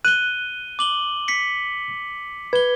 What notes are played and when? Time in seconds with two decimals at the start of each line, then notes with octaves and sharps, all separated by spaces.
0.05 F#6 D#7 G7
0.79 D6 F#7 G7
1.28 B6 C#7
2.53 B4 G#6 G7